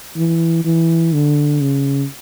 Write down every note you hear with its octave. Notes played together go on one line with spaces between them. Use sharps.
E3
E3
D3
C#3